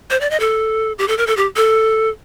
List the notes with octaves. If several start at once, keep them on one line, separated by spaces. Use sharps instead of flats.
C5
D5
D#5
A4
G4
A4
A#4
A4
G4
A4